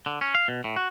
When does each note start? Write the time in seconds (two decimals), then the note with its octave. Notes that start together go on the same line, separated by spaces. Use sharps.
0.06 D3
0.21 C#4
0.35 F5
0.48 B2
0.64 A2
0.76 F#4